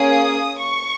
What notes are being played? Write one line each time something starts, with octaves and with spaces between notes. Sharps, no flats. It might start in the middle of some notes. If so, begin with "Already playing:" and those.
Already playing: A#3 C#4 G#4 D#6
C#6